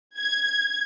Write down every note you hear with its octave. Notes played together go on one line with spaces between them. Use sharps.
G#6